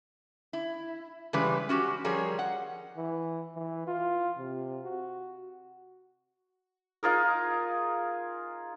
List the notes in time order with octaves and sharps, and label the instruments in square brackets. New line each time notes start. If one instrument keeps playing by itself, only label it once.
[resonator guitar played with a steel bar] E4
C#3 E3 G3 G#3 B4
C#4 F#4 G4
F3 G3 G#4 A#4 C#5
F#5
[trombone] E3
E3
F4
C3
F#4
[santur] D#4 F4 G#4 A#4